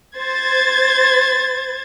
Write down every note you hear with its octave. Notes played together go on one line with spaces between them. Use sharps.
C5 G#6 A6